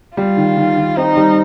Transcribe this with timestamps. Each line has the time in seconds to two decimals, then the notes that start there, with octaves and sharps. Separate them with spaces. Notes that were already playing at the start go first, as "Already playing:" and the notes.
0.17 G3 F4
0.37 D#3
0.57 D#3
0.77 D#3
0.96 C4 D#4
1.17 G3